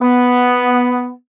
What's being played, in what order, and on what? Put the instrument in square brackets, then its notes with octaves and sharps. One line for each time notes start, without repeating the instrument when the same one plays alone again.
[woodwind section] B3